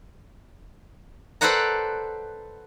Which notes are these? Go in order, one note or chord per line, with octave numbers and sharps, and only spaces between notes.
A4 B4 C5 D5 F#5 A#5